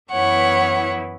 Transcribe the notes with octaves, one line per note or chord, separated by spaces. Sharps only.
F#2 E3 B3 E4 C#5 F#5